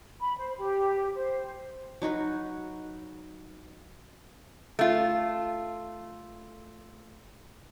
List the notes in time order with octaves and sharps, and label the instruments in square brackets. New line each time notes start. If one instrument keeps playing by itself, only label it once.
[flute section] B5
C5
G4
C5
[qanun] F#3 D#4 F#4 B4
[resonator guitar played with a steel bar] A3 F4